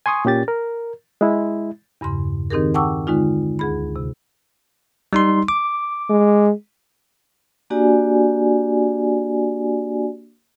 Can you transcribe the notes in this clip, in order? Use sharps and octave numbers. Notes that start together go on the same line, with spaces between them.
G#5 C6 C#6 D#6
A#2 C#4 G4 A6
A#4
G#3 E4
E2 G2 C#3 C6
D#3 C4 D#4 G4 G#4 A#4
F#5 G5 A5 C#6 D6 E6
D3 G#3 D#4 F4
D2 G#4 B5
C3
G3 D#4 C6
D6
G#3
A#3 D4 F#4 G4 D5 G#5